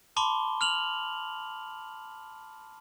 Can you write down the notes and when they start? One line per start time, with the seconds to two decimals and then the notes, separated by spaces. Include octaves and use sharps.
0.17 A5 B5 C6 D6 G7
0.61 F6 F7 F#7